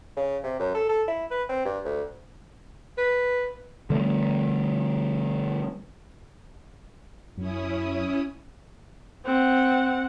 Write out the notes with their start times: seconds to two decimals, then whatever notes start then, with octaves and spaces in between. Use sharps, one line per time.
0.17 C#3
0.44 C3
0.60 F#2
0.75 A4
0.90 A4
1.08 E4
1.31 B4
1.49 C4
1.65 G2
1.85 D2
2.98 B4
3.90 D3 G3 A3
7.37 F#2 C#4 E4 D#6
9.25 C4 F#5